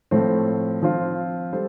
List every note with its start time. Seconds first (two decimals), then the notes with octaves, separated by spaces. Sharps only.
0.11 A2 F3 A3 C4
0.82 F3 C4 F4
1.53 G3 A4 C5